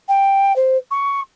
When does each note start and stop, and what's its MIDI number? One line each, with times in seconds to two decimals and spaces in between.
0.09 0.55 79
0.56 0.78 72
0.91 1.21 85